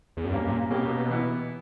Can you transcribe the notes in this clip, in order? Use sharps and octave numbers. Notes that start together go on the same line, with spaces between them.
E2
F#2
G2 A#3 C#4 G4
G2
A#2
B2 A#3 C#4 G4
E3 B3 E4